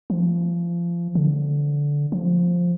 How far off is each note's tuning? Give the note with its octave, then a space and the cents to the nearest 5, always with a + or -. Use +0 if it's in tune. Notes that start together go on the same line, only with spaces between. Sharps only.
F3 -25
D3 -15
F3 +5